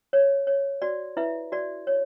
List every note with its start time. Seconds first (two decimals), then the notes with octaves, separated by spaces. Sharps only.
0.13 C#5
0.47 C#5
0.82 F#4 D5
1.17 E4 B4 E5
1.52 F#4 D5
1.87 C#5